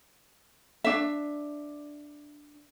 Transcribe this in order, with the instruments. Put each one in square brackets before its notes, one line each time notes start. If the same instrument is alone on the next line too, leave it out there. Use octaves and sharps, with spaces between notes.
[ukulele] D4 E5